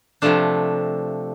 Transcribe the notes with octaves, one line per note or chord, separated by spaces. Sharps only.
C3 F3 A3 D4